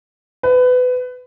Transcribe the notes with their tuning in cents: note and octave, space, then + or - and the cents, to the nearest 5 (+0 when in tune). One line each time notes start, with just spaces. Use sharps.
B4 +25